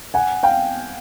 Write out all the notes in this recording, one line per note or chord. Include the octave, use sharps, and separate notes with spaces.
F#5 G#5
F5 G5